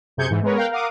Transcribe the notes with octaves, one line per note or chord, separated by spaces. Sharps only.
F#2 C3 G#4 G6 G#6 C#7
G#2 E3
G#3 B3 A#4 B4 C#5
A#4 F5 G5 F#6
A#4 F5 F#5 D6 D#6